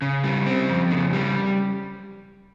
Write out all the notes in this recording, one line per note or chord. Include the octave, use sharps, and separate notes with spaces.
C#3
G3
C4
F2
C#3
G3